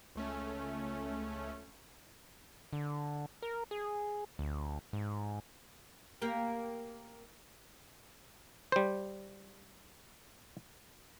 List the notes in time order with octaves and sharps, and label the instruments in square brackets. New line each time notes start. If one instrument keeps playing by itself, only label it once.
[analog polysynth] C#2 A3 C#4
[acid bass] D3
A#4
G#4
D2
G#2
[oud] A#3 G4 A#4
[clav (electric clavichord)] G3 C5